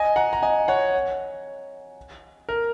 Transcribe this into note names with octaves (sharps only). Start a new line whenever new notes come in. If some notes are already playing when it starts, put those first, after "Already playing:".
Already playing: D#5 G#5
F#5 A#5
A#5
D#5 G#5
C#5 F#5
A#4